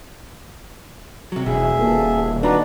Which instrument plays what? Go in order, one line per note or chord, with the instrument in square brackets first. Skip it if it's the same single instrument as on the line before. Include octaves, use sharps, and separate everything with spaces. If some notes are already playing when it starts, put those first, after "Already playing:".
[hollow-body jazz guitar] C3 F#3
[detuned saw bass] E1 [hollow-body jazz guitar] B2 [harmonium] G#4 E5
[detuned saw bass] D#1 [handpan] A#3 B3 A4
[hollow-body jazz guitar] D4 A#5 [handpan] D#4 D5 [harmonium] F#4 B4